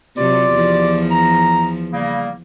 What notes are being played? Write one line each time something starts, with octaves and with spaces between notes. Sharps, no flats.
C3 F#3 F4 G4 D5
E2 F3
A#5
C#3 G3 A#3